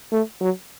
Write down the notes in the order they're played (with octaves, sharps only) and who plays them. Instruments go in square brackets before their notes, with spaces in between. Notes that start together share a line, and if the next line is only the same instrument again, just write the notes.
[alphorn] A3
F#3